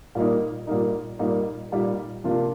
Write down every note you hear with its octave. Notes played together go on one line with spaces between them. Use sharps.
A#2 G3 A#3 D#4
A#2 G3 A#3 D#4
A#2 G3 A#3 D#4
A#2 G3 A#3 D#4
C3 F3 A#3 D4 F4